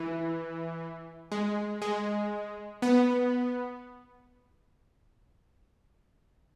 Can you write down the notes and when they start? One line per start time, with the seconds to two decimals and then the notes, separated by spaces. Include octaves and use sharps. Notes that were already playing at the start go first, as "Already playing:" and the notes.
Already playing: E3
1.32 G#3
1.82 G#3
2.82 B3